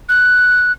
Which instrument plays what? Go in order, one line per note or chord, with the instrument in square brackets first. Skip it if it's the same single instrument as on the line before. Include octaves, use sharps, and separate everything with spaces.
[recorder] F#6